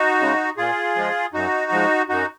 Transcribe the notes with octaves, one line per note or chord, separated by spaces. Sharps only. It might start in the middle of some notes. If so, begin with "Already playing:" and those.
Already playing: D#4 F#4
C#3 G#3
A#2 F4 G#4
F3 G#3
F#2 D#4 F#4
F3 G#3
F#2 D#4 F#4